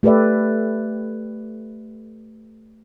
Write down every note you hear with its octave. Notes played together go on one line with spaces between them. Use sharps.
A3 G4 A4 B4 D5 E5